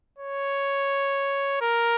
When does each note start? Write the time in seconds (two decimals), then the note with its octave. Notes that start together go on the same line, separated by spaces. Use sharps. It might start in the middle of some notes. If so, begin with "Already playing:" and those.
0.19 C#5
1.61 A#4